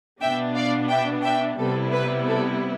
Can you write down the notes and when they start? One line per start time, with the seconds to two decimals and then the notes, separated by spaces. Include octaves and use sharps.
0.21 B2 B3 D4 E5 G5
0.55 D5 F5
0.90 E5 G5
1.24 E5 G5
1.58 C3 G3 B3 E4 A4
1.93 B4
2.27 A4